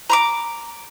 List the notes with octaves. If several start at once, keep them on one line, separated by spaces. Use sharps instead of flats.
A#5 C6 D6